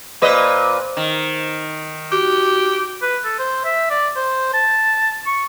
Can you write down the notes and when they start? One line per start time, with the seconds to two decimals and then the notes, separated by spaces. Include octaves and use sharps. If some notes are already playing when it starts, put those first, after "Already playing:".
0.22 A#2 B4 C5 D#5
0.97 D#3
2.11 F#4 G4
3.02 B4
3.25 A4
3.39 C5
3.65 E5
3.90 D5
4.16 C5
4.54 A5
5.27 C#6